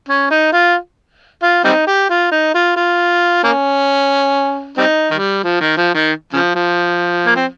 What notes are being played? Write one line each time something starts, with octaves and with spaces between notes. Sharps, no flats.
C#4
D#4
F4
F4
G3 C4 D#4
G4
F4
D#4
F4
F4
A#3 C#4
G3 C4 D#4
D#3 G3
F3
D#3
F3
D#3
C#3 F3
F3
A#3
C4